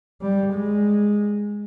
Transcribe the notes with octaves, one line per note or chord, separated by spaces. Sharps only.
G3
G#3